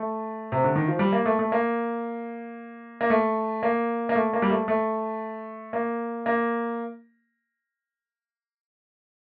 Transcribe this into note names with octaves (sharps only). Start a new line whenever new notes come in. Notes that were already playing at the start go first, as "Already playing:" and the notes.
Already playing: A3
C3
D3
D#3
F3
G3
A#3
A3
A3
A#3
A#3
A3
A#3
A#3
A3
A#3
G3
A3
A3
A#3
A#3